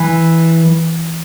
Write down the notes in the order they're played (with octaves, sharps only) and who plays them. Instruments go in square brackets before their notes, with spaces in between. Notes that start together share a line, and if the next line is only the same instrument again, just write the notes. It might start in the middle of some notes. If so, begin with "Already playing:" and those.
Already playing: [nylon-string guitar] E3